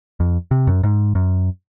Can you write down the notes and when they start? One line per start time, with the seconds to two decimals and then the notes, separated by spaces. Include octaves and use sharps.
0.20 F2
0.51 C3
0.67 F#2
0.83 G#2
1.15 F#2